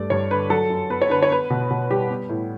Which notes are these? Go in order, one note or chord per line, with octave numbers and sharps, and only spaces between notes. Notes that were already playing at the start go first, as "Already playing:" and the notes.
Already playing: G2 A3 D5
G2 C#5
D3 B4
F#3 A4
F#2
B3 B4
C#5
D3 B4
C#5
B3 B4
B2
B2
G3 G4
B3
A2